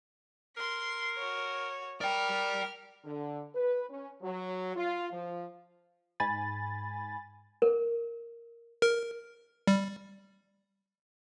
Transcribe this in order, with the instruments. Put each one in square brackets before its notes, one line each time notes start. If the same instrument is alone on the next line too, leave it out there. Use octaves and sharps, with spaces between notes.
[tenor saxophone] A#4 [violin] C6 C7
[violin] F#4 C#5
[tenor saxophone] A#4 [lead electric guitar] D5 G5 [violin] F6
[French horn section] D3
B4
C#4
F#3
F4
F3
[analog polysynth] G#2 G#5 B5 A6
[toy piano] A#4
[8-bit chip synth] A#4
G3